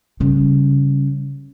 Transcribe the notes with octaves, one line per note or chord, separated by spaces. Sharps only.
C#3 G3